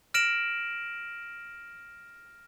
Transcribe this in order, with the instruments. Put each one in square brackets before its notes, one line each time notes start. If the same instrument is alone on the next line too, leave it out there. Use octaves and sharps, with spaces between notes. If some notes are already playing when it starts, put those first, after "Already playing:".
[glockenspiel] F6 A#6 D7 E7 F#7